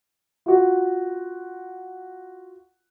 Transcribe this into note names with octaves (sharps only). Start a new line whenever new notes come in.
F4 F#4